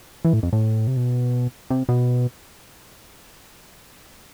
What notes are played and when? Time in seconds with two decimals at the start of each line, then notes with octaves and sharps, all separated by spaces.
0.25 E3
0.33 A2
0.43 F2
0.53 A2
0.87 C3
0.97 B2
1.70 C3
1.89 B2